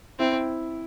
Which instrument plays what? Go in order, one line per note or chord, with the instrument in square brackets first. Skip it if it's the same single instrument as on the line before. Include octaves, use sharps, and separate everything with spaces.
[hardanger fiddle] C4 [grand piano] E4